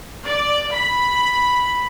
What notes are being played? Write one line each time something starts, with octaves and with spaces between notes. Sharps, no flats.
D5
B5